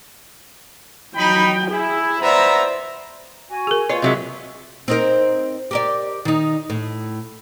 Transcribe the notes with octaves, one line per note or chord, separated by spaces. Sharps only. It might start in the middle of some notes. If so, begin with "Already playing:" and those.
F#3 D#4 G5 B5
E4 G#4
B3 C5 D5 E5 A#5
F#4 G#5
G#4 A#4
A#3 F4 B4 C#5 D#5
C3 F#3 G#3 E5
C4 D#4 A#4
G4 A#4 D5
D#3 D#4
A2